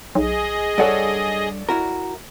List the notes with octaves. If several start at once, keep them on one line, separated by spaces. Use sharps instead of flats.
B1 G#4 D#5
G2 A4 C#5 D5 F#5
E4 F#4 A#4